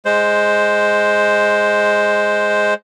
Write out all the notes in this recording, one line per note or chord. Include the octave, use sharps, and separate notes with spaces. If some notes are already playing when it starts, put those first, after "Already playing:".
G#3 C5